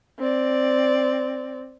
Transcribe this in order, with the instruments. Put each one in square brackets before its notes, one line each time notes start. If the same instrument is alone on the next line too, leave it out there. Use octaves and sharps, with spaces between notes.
[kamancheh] C4 D5